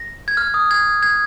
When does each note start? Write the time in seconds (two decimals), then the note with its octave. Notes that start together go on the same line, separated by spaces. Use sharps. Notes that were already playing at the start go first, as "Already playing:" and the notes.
Already playing: A#6
0.28 G#6
0.37 F6
0.54 D#6
0.71 G#6
1.03 G#6